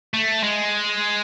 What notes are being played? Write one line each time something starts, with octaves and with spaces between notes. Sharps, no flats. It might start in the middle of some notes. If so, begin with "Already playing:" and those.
A3
G#3